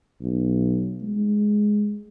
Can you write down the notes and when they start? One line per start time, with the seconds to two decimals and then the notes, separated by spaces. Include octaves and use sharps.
0.21 B1
1.02 G#3